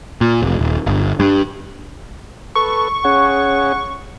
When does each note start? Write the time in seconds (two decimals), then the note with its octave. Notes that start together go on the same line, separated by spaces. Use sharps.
0.21 A#2
0.42 F1
0.59 D#1
0.86 G1
1.20 G2
2.55 A4 B4 C#6
3.05 C#4 G#4 C#5 F#5